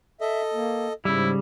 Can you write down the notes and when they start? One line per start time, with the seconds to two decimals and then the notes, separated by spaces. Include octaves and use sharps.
0.21 A4 D#5 E5
0.54 A#3
1.05 G#2 C#3 G3 E4